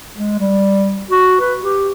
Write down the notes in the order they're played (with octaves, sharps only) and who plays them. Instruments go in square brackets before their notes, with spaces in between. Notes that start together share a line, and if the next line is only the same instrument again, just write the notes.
[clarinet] G#3
G3
F#4
B4
G4